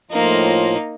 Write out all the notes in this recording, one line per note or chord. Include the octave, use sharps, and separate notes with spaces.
A2 F3 A#3 D#4 F4